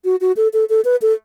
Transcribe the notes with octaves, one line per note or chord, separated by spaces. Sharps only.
F#4
F#4
A4
A4
A4
B4
A4